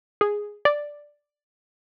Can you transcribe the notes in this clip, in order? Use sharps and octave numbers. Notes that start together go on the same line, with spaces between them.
G#4
D5